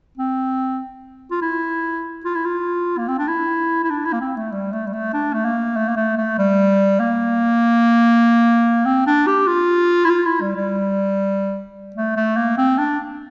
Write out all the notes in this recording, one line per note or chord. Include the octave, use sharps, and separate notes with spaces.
C4
F4
E4
F4
E4
F4
A#3
C4
D4
E4
E4
D4
E4
A#3
C4
A3
G3
A3
G3
A3
D4
A3
A#3
A3
A#3
A3
A3
G3
A#3
C4
D4
G4
F4
E4
F4
E4
G3
G3
A3
A3
A#3
C4
D4